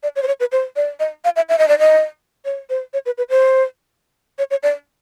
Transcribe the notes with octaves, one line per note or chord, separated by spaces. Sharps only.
D5
C#5
C5
C#5
B4
C5
D5
D#5
F5
E5
E5
D#5
D5
D#5
C#5
C5
C#5
B4
B4
C5
C#5
C#5
D5